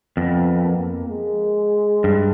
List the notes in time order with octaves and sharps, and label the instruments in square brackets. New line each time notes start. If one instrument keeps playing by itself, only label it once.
[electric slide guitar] F2 [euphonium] B3
[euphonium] A#3
G#3
[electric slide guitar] G2